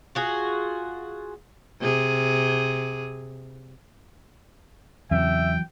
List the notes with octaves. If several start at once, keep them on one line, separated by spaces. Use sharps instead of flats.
F4 F#4 G#4
C3 G#4
E2 C#3 E3 F#3 C4 E5 G5